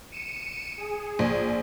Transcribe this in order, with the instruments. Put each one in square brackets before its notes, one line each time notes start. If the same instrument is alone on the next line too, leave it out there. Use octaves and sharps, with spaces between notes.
[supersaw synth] C#7 D#7 E7
G#4
[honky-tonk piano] A#1